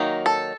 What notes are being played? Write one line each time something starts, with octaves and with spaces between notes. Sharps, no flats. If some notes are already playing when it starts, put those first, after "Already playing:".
Already playing: D#3 F#3 A#3 D#4
A4